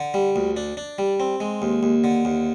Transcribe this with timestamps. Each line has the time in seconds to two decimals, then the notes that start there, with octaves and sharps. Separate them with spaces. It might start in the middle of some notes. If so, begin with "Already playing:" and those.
Already playing: D3
0.14 G3
0.36 D2
0.57 D4
0.77 D4
0.98 G3
1.20 C4
1.40 G#3
1.62 D#2
1.83 D#2
2.04 D3
2.25 D#2